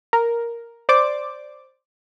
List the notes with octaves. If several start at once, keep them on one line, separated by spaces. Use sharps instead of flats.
A#4
C5 D5 D6